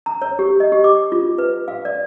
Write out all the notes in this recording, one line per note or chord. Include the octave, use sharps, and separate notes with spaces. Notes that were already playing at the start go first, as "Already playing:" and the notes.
A#5
C#5
G4
D#5
G4
D6
F4
B4
F5
D5